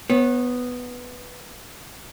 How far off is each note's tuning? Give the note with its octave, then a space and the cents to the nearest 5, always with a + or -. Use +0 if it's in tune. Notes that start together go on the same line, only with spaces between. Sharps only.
B3 +0 C#5 -35